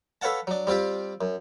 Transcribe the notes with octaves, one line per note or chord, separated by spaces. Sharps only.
A4 B4 C#5 F5 F#5 A5
F#3 D4
G3 C4 F4 G4
F#2